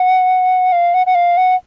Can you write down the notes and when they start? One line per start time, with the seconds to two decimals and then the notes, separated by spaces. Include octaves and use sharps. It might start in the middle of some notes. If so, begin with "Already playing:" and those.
Already playing: F#5
0.72 F5
0.94 F#5
1.06 F#5
1.15 F5
1.37 F#5